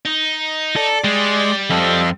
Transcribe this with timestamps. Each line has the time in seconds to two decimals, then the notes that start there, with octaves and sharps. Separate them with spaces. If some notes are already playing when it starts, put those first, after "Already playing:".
0.05 D#4
0.76 A4 D5 D6
1.04 G3 G#3
1.70 F2 C4 A4 D#5 F5